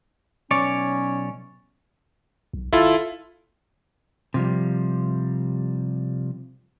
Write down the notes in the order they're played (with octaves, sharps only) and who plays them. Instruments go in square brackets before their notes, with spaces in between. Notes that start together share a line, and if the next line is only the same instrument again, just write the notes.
[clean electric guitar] B1 C#5 D5 [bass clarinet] C#4
[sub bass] B1
[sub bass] G#1 [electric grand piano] E4 F4 A4
[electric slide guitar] C3 F3 G3